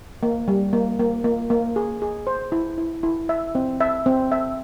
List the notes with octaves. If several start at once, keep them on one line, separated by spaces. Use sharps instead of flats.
A#3
G3
A#3
A#3
A#3
A#3
G#4
G#4
C5
E4
E4
E4
E5
C4
E5
C4
E5